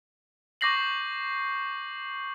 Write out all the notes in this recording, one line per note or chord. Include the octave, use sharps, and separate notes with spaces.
C#6 D6 G6 A#6 C7 F#7